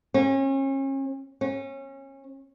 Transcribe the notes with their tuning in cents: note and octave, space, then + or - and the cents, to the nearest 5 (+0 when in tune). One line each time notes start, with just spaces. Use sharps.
C#4 -35
C#4 -25